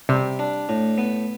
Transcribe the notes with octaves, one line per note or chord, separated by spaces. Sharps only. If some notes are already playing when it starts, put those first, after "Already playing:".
C3 G3
D4
A2
B3